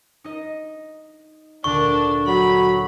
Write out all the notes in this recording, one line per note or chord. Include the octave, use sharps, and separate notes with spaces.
D#4 D#5
D2 A#2 D4 C#6
F#3 B5